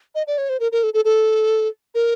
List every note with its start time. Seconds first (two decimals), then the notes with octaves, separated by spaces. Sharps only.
0.15 D#5
0.27 D5
0.38 C#5
0.49 C5
0.60 A#4
0.72 A#4
0.83 A4
0.94 A4
1.05 A4
1.95 A#4